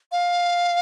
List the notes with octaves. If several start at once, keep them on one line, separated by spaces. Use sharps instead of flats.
F5